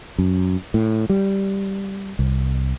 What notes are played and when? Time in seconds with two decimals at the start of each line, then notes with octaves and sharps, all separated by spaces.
0.18 F#2
0.74 A2
1.09 G3
2.19 C2